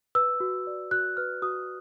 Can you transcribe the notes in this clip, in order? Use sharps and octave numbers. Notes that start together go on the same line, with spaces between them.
B4 E6
F#4
D5
F#4 F#6
B4 F6
F#4 D#6